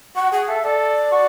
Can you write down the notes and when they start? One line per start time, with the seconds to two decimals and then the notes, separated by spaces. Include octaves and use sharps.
0.16 F#4 F#5
0.32 G#4 F#5
0.48 A4 E5
0.64 A4 D5
1.12 F#4